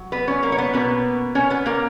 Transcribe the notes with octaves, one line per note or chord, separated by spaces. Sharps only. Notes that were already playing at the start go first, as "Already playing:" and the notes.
Already playing: F#3
B3 B4
C#4 C#5
A#3 A#4
C#5
B3 B4
B2 A#3 B3 C#4 B4
C#4 C#5
B3 B4
A#3 A#4